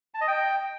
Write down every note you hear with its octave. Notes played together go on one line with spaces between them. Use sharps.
A5
D#5
G5